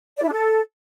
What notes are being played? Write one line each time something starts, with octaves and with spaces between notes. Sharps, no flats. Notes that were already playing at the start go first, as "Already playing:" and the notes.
D5
E4
D4
A4